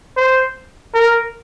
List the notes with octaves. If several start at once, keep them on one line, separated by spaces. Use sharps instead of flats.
C5
A#4